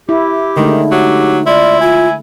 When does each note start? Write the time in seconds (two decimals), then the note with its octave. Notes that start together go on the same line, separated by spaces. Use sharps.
0.09 E4 G4
0.56 D3 D#3 G#3 A3 D#4
0.92 F#3 G4
1.47 E4 F4 D5
1.81 F4 G#5